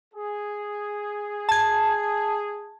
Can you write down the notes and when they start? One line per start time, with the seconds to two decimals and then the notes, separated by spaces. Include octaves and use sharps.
0.14 G#4
1.49 A5 G#6